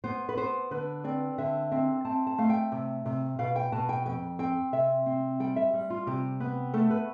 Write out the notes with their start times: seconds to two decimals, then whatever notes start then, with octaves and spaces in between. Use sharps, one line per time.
0.04 B3 C5
0.29 B4
0.37 B3 C5
0.71 D3 B4
1.04 C4 D5
1.38 D3 E5
1.71 C4 E5
2.05 C4 A5
2.27 A5
2.38 A3 F5
2.50 G5
2.72 C3
3.06 C3
3.39 B2 F5
3.56 G5
3.72 B2 A5
3.89 G5
4.06 F2 G5
4.39 C4 G5
4.73 C3 E5
5.06 C4
5.40 G3 G5
5.56 E5
5.74 G3
5.90 F4
6.07 C3 G4
6.40 B3
6.74 A3 A4
6.91 B4